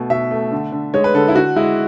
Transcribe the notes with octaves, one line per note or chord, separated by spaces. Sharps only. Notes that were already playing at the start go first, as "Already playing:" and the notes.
Already playing: B2 A3
B2 E5
A3
D3
D3
G#3 C#5
B4
D3 A4
E4
D3 F#4
G#3 E4